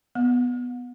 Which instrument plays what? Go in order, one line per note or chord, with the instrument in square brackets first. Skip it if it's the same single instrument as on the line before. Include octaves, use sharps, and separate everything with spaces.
[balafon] B3